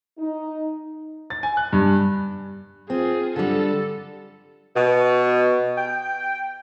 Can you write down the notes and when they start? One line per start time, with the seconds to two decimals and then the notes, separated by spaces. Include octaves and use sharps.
0.18 D#4
1.30 A6
1.43 G#5
1.57 F#6
1.73 G2
2.90 C4 F4 G#4
3.36 D3 G3 A4
4.76 B2
5.76 G5